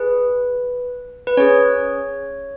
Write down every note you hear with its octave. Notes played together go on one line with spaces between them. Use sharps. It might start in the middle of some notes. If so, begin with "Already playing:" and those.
Already playing: G#4 B4
B4
C#4 G#4 C#5